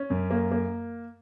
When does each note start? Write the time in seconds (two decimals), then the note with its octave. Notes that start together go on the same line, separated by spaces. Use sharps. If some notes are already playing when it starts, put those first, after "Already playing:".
Already playing: C#4
0.10 F#2
0.31 A#3
0.51 A#3